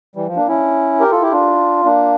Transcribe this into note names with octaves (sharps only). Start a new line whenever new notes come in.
E3 G3
F3
A#3 D4
C#4 E4
G4 A#4
F4 A4
E4 G4
D4 F4
A#3 D4